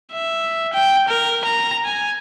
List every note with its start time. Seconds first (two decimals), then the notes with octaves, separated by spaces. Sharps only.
0.12 E5
0.73 G5
1.08 A#4
1.45 A#5
1.85 G#5